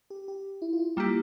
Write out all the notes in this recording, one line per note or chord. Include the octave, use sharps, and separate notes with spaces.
G4
G4
E4
F4
E4
G3 A#3 E4 F4 G4